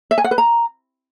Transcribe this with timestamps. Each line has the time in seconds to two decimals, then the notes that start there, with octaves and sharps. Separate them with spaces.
0.11 E5
0.18 G#5
0.24 F#5
0.31 B4
0.38 A#5